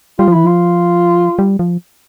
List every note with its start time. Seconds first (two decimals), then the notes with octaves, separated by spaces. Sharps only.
0.19 G3 F4
0.28 F3
0.32 E3 E4
0.44 F3 F4
1.39 G3
1.59 F3